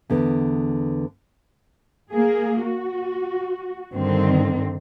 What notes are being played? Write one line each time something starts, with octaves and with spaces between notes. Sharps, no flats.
E2 D3 B3
A#3 G#4
F#4
G2 D3 D#3 C4